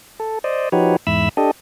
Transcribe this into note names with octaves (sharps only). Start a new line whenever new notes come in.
A4
C5 D5 D#5
F3 D#4 F#4 G4 B4 C#5
E2 G#2 E5 B5 E6
D4 G4 A4 D#5